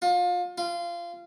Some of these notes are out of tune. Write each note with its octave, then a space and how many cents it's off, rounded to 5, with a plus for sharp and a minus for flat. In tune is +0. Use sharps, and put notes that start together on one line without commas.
F4 +30
F4 -20